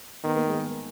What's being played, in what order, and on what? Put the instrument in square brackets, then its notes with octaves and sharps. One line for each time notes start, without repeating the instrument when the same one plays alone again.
[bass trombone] D#3 [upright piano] B3
[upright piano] A#3
G#3 B3